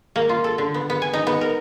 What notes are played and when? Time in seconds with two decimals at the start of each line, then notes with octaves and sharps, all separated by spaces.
0.16 A#3
0.29 F4
0.44 A4
0.58 D3
0.74 B3
0.90 B3
1.02 G#5
1.13 D#4
1.27 B3
1.41 A#4